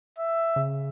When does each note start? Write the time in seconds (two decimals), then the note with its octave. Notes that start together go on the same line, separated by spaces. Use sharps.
0.18 E5
0.56 C#3